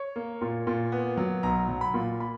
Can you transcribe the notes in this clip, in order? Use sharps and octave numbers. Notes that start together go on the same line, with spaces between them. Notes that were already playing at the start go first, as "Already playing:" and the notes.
Already playing: C#5
A#3
A#2
A#2
B3
F#3
B1 A#5
F#3
B5
A#2
B5